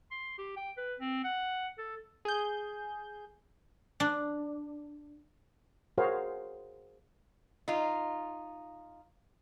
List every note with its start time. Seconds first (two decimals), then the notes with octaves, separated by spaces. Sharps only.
0.11 C6
0.38 G4
0.56 G5
0.78 B4
1.00 C4
1.24 F#5
1.78 A4
2.25 G#4 G6
4.00 D4
5.98 F#4 G#4 A#4 C5 C#5 F5
7.68 D#4 F4